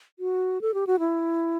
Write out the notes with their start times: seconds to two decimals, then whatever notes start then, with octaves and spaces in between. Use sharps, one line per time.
0.19 F#4
0.61 A4
0.74 G4
0.87 F#4
1.00 E4